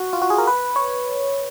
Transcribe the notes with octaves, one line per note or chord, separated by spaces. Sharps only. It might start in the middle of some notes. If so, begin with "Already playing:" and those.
Already playing: F#4
F4
F#4
G#4
A#4
B4
C#5